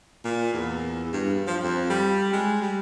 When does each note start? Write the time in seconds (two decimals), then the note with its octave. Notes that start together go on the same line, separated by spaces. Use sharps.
0.25 A#2
0.53 E2
1.13 G2
1.47 F3
1.62 F2
1.90 G3
2.33 G#3
2.62 G3